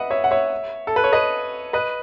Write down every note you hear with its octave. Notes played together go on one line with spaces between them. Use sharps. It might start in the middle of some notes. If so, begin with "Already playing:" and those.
Already playing: B4 D#5 E5 F#5
C#5 E5
F#5
C#5 E5
A4
B4
C#5
B4 D#5
B4 D#5